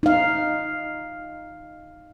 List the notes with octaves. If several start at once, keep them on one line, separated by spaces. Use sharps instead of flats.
D#4 F5